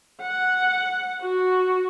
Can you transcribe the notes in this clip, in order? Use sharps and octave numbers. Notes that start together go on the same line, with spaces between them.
F#5
F#4